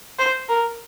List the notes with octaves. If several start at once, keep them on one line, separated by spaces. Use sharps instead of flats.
C5
A#4